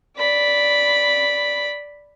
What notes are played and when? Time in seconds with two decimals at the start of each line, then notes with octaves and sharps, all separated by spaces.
0.18 D5 B5